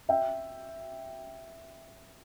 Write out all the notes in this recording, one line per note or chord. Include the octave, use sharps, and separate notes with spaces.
E5 G5